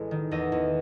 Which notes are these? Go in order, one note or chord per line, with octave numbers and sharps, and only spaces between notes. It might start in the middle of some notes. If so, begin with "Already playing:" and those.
Already playing: A1 G#3
D#3
E2 D#5
E2